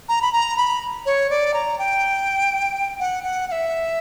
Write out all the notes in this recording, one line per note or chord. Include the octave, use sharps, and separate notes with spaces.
A#5
B5
A#5
B5
C#5
D5
A#5
G5
F#5
F#5
F#5
E5